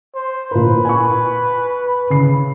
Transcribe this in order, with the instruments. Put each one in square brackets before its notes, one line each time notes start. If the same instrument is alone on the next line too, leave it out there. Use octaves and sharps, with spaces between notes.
[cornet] C5
[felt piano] A#2 A#4 [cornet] B4
[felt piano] G#5 C#6
C#3 C7